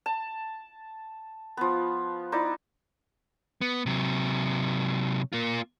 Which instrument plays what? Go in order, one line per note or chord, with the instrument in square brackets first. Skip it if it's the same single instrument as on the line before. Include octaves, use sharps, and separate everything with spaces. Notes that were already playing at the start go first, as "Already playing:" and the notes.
[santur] A5
F3 B3
D#4 E4 D5
[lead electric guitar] B3
C3 F#3
A#3 F4